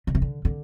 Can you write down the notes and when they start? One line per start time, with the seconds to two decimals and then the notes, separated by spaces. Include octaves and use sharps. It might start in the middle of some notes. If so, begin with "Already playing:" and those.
0.07 D3
0.15 C3
0.22 D3
0.45 D3